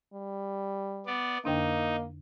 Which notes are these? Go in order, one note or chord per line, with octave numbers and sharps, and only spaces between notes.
G3
B3 D5
F2 D3 A#3 D4 D#4